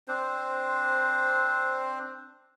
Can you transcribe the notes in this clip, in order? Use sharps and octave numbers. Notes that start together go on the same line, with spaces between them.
C4 D4 C5